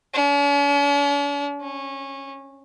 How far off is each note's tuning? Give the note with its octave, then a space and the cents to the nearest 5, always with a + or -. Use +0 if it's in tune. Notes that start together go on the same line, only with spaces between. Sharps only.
C#4 +45
C#4 -20